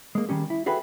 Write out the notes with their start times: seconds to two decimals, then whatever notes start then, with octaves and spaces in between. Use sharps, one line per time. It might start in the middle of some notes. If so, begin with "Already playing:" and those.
0.15 G#3 A#3
0.29 D#3 G3 C#4 G4
0.50 E4
0.66 F#4 G#4 A4 B4 E5 G5